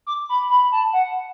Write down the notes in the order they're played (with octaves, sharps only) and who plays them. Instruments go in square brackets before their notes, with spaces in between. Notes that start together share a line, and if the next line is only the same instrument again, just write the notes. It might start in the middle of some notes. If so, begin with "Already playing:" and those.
[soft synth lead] D6
B5
B5
A5
F#5